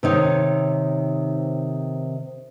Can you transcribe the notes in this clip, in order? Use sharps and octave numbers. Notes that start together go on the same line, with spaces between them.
C3 D#3 D#4 C#5